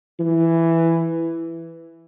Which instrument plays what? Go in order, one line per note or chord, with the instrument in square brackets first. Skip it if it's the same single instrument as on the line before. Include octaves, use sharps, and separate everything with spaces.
[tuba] E3